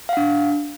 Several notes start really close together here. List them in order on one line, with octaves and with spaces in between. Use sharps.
F5 F#5 D4